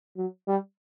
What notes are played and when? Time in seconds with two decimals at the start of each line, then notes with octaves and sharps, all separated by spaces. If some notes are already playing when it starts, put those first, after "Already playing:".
0.16 F#3
0.48 G3